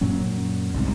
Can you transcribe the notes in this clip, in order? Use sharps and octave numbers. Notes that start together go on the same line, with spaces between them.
F#2 A#2 F#3 C#4
F#1 C2 G#2 C3